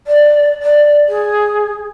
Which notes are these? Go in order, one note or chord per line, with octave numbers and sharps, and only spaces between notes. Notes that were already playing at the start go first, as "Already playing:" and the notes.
D5
D5
G#4